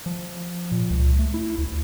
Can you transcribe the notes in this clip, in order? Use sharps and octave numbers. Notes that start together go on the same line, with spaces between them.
F3
A#2
C#2
A3
E4
D2